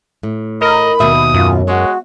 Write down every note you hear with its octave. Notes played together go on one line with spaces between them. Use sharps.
A2
A#4 D#5 B5
D#2 B2 E5 D#6
F#2 F4
G#3 F#4 C#5